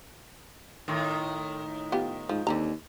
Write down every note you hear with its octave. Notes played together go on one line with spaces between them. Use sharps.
A2 D#3
B3 F4 G4
G#2 F3
D#2 D3 C4 A#5